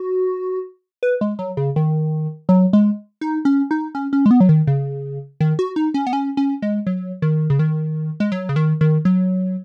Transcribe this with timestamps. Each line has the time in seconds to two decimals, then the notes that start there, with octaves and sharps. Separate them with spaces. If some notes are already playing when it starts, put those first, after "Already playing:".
Already playing: F#4
1.03 B4
1.21 G#3
1.39 F#3
1.57 C#3
1.76 D#3
2.49 F#3
2.73 G#3
3.21 D#4
3.45 C#4
3.71 D#4
3.95 C#4
4.13 C#4
4.26 G#3
4.31 B3
4.40 F#3
4.49 D#3
4.67 C#3
5.40 D#3
5.59 F#4
5.76 D#4
5.94 C#4
6.07 B3
6.13 C#4
6.37 C#4
6.62 G#3
6.87 F#3
7.22 D#3
7.50 C#3
7.59 D#3
8.20 G#3
8.32 F#3
8.49 C#3
8.56 D#3
8.81 D#3
9.05 F#3